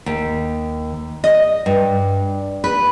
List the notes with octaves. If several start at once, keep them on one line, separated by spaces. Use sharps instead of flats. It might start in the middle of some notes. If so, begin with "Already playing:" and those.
D#2
D#5
G2
B4